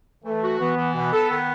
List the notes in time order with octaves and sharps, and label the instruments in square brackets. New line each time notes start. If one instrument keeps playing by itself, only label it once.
[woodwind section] E3 [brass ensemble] A3
[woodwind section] F#4
[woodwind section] E3 [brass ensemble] B3
[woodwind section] E3
[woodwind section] B2 [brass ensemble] B3
[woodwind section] A4
D#3